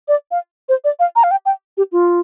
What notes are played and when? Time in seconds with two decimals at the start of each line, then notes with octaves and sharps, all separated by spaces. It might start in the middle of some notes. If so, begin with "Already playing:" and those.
0.08 D5
0.31 F5
0.69 C5
0.84 D5
1.00 F5
1.16 A#5
1.24 F5
1.31 G5
1.46 G5
1.77 G4
1.92 F4